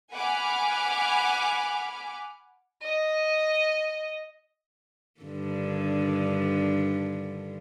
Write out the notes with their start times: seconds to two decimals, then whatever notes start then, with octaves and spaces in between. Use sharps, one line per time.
0.13 F#5 G#5 B5 D6 F6
2.83 D#5
5.21 G2 D3 D#3